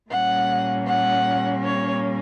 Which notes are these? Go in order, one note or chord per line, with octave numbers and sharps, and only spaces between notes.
A#2 G3 A#3 C#4 F#5
F#5
C#5